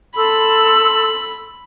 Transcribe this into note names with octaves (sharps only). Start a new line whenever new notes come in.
A4 B5 C6 E6